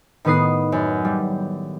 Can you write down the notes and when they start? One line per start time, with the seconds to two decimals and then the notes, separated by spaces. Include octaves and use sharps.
0.25 A2 D#3 B3 B4 D#6 C7
0.72 F#2
1.05 G3